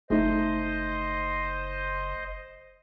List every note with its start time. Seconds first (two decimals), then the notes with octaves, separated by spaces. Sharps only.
0.10 F#1 A3 D#4 C5 D#5